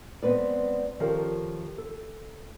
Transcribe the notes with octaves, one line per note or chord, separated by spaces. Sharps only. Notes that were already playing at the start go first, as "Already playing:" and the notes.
G#3 B3 C4 B4 D5
D#3 F3 C#4 G4 A4 A#4
A4